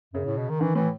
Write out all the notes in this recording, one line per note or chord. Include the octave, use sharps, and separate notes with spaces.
F#2 C#3
A2
B2
D#3
D#3 E3
A2 E3